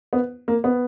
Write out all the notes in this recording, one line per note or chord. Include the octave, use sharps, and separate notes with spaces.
B3
A#3
B3